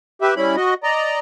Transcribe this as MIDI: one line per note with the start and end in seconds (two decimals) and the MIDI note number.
0.22 0.34 67
0.22 0.34 71
0.22 0.34 76
0.36 0.56 55
0.36 0.56 61
0.36 0.56 64
0.36 0.56 83
0.56 0.74 66
0.56 0.74 75
0.83 1.20 74
0.83 1.20 75
0.83 1.20 82